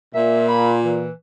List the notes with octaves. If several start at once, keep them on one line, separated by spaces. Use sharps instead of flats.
A#2 E5
B5
E3